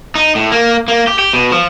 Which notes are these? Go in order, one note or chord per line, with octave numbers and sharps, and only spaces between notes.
D#4
A2
A#3
A#3
G4
G4
B2
F3